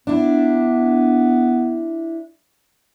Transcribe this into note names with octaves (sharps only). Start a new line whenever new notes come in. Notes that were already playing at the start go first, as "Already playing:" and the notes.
B3 D4 E4